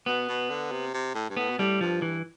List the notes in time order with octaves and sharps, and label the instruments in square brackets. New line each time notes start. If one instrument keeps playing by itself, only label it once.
[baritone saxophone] B2 [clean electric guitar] B3
[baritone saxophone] B2
D3
C3
C3
A2
G2
[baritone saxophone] A2 [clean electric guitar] B3
[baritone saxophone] B2
[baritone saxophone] A2 [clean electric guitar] G3
[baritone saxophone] G2 [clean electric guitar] F3
[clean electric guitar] E3